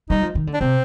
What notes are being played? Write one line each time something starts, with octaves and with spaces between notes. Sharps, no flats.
G3 D#4
F3
D#3
D3
D4
C3 C4